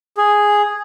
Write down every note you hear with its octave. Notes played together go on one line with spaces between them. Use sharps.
G#4